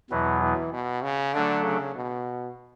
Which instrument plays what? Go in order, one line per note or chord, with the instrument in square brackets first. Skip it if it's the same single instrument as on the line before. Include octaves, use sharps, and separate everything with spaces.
[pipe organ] E2 B2 F#3 B3 [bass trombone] E3
[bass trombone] E3
B2
C#3
[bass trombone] D3 [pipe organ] F#3 A3 D4 A4
[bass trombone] C#3
B2